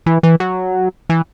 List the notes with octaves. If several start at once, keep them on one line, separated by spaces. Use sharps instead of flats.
E3
E3
F#3
E3